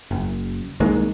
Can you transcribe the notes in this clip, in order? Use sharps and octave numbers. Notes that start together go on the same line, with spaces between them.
F#1
C2 D#3 G#3 A#3